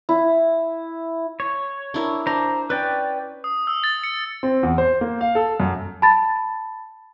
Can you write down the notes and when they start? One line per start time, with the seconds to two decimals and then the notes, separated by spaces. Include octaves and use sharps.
0.09 E4
1.40 C#5
1.94 D4 E4 A#4
2.27 D4 C5 A#5
2.70 C#4 B4 D5 G5
3.44 D#6
3.67 E6
3.84 A6
4.04 C#7
4.43 C4
4.63 E2
4.78 C5
5.01 A#3
5.21 F5
5.35 A4
5.60 F#2
6.02 A5 B5 A6